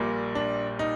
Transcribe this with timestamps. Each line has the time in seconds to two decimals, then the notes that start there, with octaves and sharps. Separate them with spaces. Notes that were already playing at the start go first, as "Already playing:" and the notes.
Already playing: A#1 A#2 G3 A#3
0.35 D4
0.79 D#4